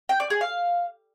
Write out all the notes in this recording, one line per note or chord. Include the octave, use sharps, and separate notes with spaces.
G5
D5
G#4
F5